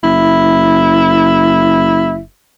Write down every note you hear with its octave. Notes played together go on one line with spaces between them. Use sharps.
F#1 E4